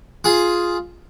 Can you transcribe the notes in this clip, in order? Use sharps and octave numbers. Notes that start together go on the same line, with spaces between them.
F4 G#4